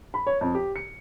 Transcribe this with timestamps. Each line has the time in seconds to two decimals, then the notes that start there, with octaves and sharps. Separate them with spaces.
0.14 B5
0.27 C#5
0.41 F2
0.55 G4
0.76 C#7